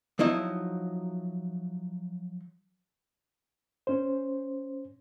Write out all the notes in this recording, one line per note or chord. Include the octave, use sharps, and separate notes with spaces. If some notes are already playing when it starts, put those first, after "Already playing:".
F3 F#3 D#4 E4 D#5
C#4 C5